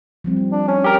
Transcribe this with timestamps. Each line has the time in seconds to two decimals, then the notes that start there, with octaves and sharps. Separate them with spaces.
0.24 F3 G3 C4
0.37 G3
0.52 D4
0.68 C#4
0.84 G4 A#4